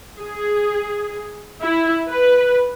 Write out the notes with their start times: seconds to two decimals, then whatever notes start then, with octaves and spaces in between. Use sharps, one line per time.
0.19 G#4
1.62 E4
2.09 B4